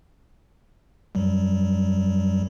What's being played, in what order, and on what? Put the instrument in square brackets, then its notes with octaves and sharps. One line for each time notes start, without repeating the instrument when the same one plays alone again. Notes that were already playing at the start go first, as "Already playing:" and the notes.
[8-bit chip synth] F#2 F#3 G3